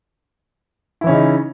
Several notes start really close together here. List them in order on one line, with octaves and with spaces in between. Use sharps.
E4 E3 C#4 C#3 D#4